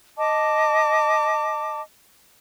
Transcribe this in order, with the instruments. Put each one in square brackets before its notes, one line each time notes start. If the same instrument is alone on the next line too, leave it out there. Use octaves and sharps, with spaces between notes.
[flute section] D#5 A5 D6